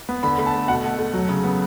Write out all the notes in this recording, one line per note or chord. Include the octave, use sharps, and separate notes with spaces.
B3
D3 B5
A3 B5
A5
A3
B2 F#5
A3
A3
F#3
C#3
B3